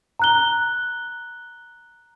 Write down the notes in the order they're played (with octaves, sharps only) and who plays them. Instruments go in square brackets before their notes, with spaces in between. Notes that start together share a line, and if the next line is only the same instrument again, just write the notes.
[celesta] A#5 F#6 G7